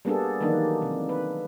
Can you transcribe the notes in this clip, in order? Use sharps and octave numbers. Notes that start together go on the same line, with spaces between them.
G3 A#3 B3 D4 G#4 A4
D#3 E3 F#3 A#3 D4 D#4
C3
B4